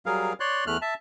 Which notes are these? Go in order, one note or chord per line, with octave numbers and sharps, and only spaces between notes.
F#3 G3 G#4 A#4 F5
C#5 D5 C6 F#6
E2 A3 F6 F#6
E5 A5